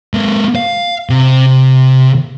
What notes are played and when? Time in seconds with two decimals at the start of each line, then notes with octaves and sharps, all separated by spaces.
0.14 G#3 A#3
0.56 F5
1.10 C3